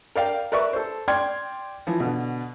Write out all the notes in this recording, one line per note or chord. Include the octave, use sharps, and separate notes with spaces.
A#4 D5 F5 G5
A#4 B4 D5 E5 C#6
A4 C5
D5 G5 C6 D6 F6 G#6
E3 F3
B2 D3